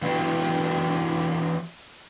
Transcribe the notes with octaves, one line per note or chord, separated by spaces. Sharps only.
E3 B3 D4 E4 F#4 G4